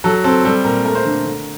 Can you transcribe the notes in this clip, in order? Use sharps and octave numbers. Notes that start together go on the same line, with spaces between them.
F#3 A4
C4 A4
G3 A4
A#2 A#4
A3 A#4
C5
D3 A#4
D3